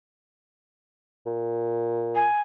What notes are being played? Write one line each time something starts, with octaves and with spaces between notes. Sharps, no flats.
A#2
G#5